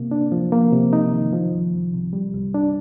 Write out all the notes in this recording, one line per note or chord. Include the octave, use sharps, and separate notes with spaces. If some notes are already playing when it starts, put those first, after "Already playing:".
Already playing: C3 A#3
D4
F3
A#3
C3
D#4
D#3
F3
C2
C2
C3
G3
C2
D4